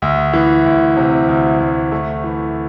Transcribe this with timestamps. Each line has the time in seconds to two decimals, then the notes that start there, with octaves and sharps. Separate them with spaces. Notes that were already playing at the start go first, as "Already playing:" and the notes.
0.02 D2
0.34 E3
0.66 D2
0.97 C3
1.28 D2
1.60 D2
1.92 A3
2.24 E3